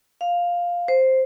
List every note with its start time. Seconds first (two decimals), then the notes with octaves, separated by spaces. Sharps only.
0.21 F5
0.88 C5